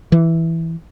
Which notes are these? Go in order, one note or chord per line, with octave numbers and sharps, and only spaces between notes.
E3